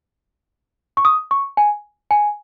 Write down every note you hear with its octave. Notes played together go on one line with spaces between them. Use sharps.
C#6
D#6
C#6
G#5
G#5